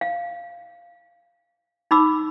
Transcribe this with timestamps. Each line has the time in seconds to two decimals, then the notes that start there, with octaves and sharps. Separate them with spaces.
0.01 F5
1.91 D#4 B5 D6 E6